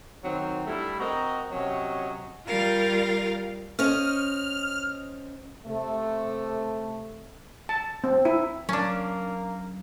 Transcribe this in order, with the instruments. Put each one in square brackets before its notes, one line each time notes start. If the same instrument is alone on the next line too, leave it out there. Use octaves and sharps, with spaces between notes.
[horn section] D#3 F#3 C4
G3 A3 D4 E4
C4 F#4 A#4 D#5 A#5
C3 F#3 C#4 C#5 D#5
[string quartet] G3 F4 A#4 F5
[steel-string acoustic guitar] C#4 C5 D#5 [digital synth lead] F6
[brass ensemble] C3 A3
[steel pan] A5
C4
E4
[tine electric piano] F#3 [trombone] A#3 [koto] C#4 D4